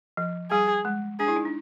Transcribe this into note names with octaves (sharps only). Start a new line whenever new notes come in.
F3
G3 G#4
G#3
D4 G#4
E4
D#4
D4